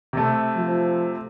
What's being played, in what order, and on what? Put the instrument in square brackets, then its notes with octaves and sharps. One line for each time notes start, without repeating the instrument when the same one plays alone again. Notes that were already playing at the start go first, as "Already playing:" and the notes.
[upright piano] C3 A3
[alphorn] F3